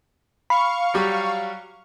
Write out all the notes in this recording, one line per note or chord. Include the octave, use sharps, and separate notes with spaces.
F5 B5 C#6
F#3 G3